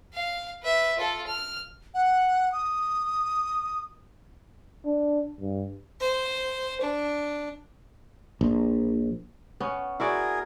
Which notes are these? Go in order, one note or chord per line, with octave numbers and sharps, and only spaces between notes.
F5
B4 E5
F4 A4
F6
F#5
D#6
D4
G2
C5
D4
A#1
B3 C#4
E4 F#4 G#4 A#4 D5